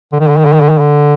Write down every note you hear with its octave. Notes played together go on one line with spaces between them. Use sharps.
D3
D#3
D3
D#3
D3
D#3
D3
D#3
D3